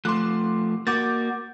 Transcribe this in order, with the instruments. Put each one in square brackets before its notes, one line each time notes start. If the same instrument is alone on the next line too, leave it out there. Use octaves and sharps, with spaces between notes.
[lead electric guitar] F3 A3 [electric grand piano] C6 D6 F#6
[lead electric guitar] A#3 F#4 [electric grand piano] D6 G6 A6